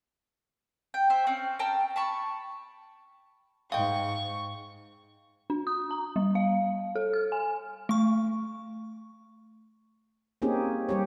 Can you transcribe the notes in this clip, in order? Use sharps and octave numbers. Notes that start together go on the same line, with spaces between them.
G5
C5 E5
C4 C#4 G5
G5 A5 A#5 F6
A5 B5 C#6
G#2 G#3 F5 G5 C#6
D4
D#6
A#5
G3
F5
A4
F6
G#5
A3 C#6
A#3 C4 C#4 D#4 G4 G#4
G3 G4 C#5